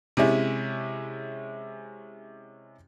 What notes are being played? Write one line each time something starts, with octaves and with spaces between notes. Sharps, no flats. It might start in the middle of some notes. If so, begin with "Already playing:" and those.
C3 G#3 C#4 E4